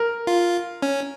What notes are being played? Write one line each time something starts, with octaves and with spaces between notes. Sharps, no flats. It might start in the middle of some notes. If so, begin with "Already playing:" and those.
Already playing: A#4
F4
C#4